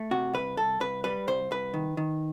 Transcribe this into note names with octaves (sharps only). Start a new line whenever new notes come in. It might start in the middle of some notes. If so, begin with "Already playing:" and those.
Already playing: A3
C3 F#4
C2 B4
C2 A4
C2 B4
G3 B4
C2 C5
C2 B4
D#3
D#3